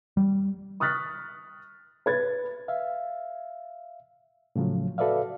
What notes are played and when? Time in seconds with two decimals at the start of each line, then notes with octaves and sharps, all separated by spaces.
0.17 G3
0.80 C#6 D#6 F6 F#6 A6 B6
2.06 B4 G#6 A6
2.68 E5 F5
4.56 A2 C#3 F3 F#3
4.98 F#4 A4 B4 D5 E5 F5